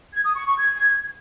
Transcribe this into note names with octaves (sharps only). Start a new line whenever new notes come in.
G#6
D#6
C#6
C#6
G#6